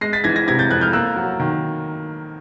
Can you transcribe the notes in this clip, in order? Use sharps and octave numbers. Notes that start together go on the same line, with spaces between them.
G#3 A#6 C7
A6 B6
E3 G#6 A#6
G#6 A#6
C3 G#6 A#6
G6 A6
F2 F#6 G#6
F6 G6
A#3 E6 F#6
F#3
D#3